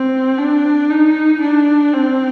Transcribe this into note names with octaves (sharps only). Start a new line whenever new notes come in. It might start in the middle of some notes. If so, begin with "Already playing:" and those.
Already playing: C4
D4
D#4
D4
C4